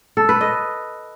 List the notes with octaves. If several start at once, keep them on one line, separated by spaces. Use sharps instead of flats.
A4
B4
D#5